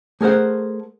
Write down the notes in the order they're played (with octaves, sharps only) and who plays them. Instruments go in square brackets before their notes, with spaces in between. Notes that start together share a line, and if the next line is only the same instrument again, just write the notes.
[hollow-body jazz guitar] A3 G#4 A#4 C5 F#5